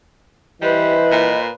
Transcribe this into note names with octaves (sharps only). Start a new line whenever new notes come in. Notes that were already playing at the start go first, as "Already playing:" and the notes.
E3 G3 B4 C5 D#5
A#2